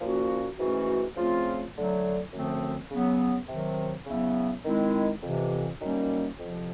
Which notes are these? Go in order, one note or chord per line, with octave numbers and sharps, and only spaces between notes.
A#2 F3 A#3 C#4 F#4
G#2 E3 A3 C#4 F#4
C#3 F3 A3 C4 F4
D3 F#3 A3
F#2 D3 F3 A3 C4
C#3 F#3 B3
C3 D#3 F#3
C#3 F#3 B3 E4
D#3 G#3 C4 E4
F2 C3 E3
F#2 D#3 G3 A#3 C#4
F2 C3 F3